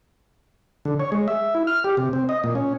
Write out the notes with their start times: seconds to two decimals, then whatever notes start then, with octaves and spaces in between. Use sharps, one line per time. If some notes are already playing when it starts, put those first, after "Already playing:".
0.85 D3
1.00 C#5
1.12 G#3
1.28 E5
1.55 E4
1.67 F6
1.84 G4
1.97 C3
2.13 C4
2.29 D#5
2.44 A#2
2.55 C#4